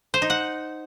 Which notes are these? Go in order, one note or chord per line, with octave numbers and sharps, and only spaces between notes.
C5
D#4
F#5